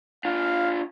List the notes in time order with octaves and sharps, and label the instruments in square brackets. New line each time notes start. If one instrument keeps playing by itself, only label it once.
[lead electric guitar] D4 F4 [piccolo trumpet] F5